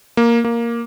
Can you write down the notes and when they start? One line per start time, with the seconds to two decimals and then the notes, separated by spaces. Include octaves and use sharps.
0.17 A#3
0.44 A#3